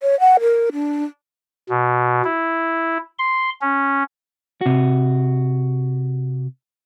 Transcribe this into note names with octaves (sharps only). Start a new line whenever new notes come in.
C#5
F#5
A#4
D4
B2
E4
C6
C#4
C3 F#4